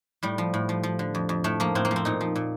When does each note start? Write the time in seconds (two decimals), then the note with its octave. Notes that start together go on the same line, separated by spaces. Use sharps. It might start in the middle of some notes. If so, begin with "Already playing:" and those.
0.23 A2 G3
0.38 F3
0.54 A2
0.69 F3
0.83 F3
0.99 D3
1.15 F2
1.29 F2
1.44 A2 A3
1.60 F3 A#3
1.75 A2 C4
1.85 A#3
1.91 F3
1.96 C4
2.05 A#2 D#4
2.21 F3
2.36 A#2